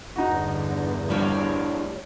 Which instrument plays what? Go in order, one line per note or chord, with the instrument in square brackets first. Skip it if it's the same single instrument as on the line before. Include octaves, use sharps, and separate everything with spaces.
[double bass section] E2 G2 D3 [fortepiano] D#4 F#4
[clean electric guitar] A2 F3 D4 [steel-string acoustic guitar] G3 C#5 D5